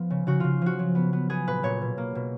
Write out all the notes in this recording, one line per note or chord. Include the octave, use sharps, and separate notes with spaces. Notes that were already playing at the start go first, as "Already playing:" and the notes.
Already playing: F3 B3
C#3
C#3 F#4
C#3 F4
F3 F#4
F#3
B3
B3
B3 G#4
A#2 B4
A#2 C#5
B2
A#3
B2